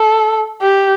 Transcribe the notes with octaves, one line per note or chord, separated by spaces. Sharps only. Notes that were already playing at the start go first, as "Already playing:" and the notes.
Already playing: A4
G4